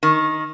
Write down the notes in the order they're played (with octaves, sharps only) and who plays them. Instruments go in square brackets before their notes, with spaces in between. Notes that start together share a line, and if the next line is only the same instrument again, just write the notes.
[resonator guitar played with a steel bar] D#3